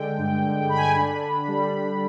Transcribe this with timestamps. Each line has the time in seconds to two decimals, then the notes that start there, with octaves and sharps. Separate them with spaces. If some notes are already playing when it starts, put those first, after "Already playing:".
Already playing: D3 G#3 G5
0.18 G2
0.43 D3
0.69 D3 B5
0.77 G#5
0.85 B5
0.95 D4
1.22 D4
1.48 G3